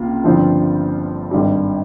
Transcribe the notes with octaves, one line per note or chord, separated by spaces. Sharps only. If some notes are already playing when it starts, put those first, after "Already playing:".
Already playing: C#2 C3 A#3 F4
G1 G2 F3 C4 F4
G#1 G2 G3